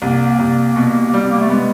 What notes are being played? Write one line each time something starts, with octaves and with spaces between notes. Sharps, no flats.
C2 A#3
C2
B2
G3
B3
A#3
A3
G#3 B3